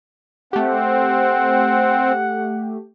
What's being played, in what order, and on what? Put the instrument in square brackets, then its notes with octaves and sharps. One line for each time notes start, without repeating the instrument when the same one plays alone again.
[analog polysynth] A3 G4 [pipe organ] C4 [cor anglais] F#5